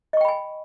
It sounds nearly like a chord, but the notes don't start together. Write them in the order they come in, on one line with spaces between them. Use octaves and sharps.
D#5 C#6 G5 B5 G#5